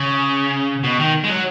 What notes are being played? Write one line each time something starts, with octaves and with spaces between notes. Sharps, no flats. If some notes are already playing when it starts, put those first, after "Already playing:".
Already playing: C#3
B2
D#3
G#3
F#3